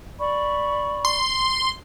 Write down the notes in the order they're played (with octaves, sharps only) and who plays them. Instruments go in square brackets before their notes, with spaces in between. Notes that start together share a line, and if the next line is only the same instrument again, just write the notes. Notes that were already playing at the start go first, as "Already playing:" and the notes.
[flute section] D5 B5 C#6
[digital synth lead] C6